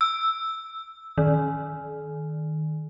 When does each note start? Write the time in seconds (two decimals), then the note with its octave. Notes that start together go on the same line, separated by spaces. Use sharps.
0.01 E6
1.18 D#3